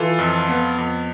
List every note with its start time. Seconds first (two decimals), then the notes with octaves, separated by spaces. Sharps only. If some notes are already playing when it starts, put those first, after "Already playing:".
Already playing: E3 F4 A4
0.19 F2
0.49 B3
0.78 F2